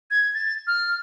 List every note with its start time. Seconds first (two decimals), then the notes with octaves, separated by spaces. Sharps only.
0.11 G#6
0.34 A6
0.67 F6